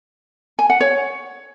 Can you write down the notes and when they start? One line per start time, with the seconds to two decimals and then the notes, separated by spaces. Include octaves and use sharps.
0.59 G#5
0.70 F#5
0.81 C#5